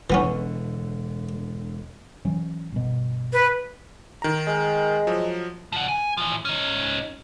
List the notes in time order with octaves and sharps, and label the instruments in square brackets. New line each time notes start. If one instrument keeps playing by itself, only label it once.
[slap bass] E1 D3 [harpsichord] E3 B3 C#4
[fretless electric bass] E3 F#3 C#4
G1 B2
[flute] B4
[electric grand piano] D#3 A#5
[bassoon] G#3
[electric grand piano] F3 F#3
[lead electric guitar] F3 F#5
G#5
E3 F3
C#4 D#4